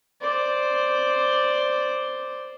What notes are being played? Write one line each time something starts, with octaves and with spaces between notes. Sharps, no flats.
C5 D5